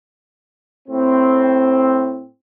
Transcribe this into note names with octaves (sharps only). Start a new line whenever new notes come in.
A2 C4